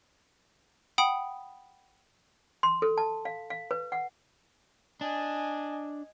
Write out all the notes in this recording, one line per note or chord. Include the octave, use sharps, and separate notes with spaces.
F#5 G5 B5 D#6
C6
A4
A5
F5
F5
B4
F#5
D4 D#5 G#5